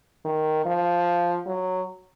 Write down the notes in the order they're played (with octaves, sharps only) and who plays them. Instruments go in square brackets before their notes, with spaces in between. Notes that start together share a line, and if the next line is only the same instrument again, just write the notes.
[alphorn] D#3
F3
F#3